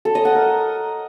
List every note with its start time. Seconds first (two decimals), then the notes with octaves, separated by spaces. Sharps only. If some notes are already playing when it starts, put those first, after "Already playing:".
0.05 A4
0.15 D#5
0.25 F#5
0.35 A#4